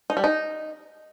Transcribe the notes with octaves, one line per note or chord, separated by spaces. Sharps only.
D#4
G3
D#4